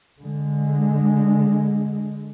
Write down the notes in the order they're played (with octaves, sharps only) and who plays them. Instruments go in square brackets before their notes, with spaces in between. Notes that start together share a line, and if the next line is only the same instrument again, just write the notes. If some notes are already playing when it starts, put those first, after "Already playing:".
[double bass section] D3 G#3